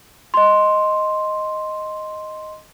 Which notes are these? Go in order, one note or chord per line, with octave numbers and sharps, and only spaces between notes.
D#5 C6